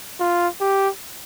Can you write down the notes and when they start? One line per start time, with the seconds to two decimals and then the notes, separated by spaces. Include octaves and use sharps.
0.20 F4
0.61 G4